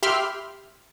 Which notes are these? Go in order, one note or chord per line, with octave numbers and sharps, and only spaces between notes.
G4 E5 B5 C6 F6